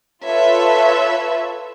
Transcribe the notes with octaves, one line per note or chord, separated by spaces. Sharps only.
F4 A4 B4 C#5 E5